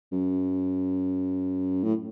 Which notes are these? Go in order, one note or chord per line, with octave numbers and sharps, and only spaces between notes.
F#2
A2